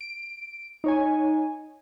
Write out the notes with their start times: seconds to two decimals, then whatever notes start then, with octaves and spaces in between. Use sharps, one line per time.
0.01 D7
0.84 D#4 C#5 G#5